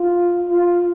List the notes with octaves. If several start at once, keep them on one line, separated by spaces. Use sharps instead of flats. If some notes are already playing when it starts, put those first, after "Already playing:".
Already playing: F4
F4